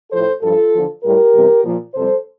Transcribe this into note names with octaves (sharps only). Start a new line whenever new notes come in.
A2 F3 A4 C5
G2 F3 F4 A4
E2 D3 F3
A2 G3 G4 A#4
E2 C3 G3
A#2 F3
F2 C3 G3 A4 C5